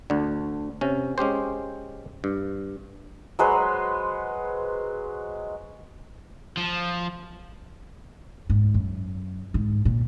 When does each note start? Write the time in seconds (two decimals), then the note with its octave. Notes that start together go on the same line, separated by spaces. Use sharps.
0.10 D2 D3
0.81 C3 C#4
1.18 G#3 C#4 G4 C5
2.24 G2
3.39 F#3 G#3 B4 C5
6.57 F3
8.50 G#2
8.74 F#2
9.54 G#2
9.85 A#2